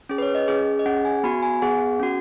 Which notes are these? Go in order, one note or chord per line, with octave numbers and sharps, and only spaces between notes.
C#4 G#4
B4
C#5
D#5
C#4 G#4
D#5
C#4 G#4 F#5
G#5
B3 F#4 B5
G#5
B3 G#4 F#5
C#4 F#4